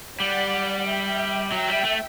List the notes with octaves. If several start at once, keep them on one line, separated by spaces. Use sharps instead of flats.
G3 D5 F#5
E5 G5
F#3 E5 G5
G3
A3